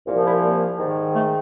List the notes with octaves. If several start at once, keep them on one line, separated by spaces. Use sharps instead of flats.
C2 A#2 F3
E4
A#3
G#2 D#3
A3